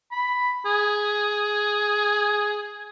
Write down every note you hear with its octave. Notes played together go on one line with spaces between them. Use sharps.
B5
G#4